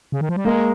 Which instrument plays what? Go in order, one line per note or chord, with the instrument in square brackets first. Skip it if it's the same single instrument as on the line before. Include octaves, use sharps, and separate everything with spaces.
[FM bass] C#3
D#3
F3
G3
[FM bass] G#3 [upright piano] A#3